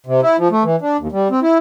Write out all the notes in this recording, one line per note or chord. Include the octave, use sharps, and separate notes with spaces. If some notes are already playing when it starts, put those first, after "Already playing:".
C3
E4
F3
A3
E3
D4
D#2
G3
C4
E4